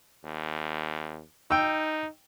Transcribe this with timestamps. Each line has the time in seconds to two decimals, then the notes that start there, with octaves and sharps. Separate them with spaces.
0.24 D#2
1.51 D#4 G5 E6